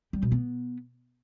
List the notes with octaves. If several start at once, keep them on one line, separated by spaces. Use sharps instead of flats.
G3
B2
B3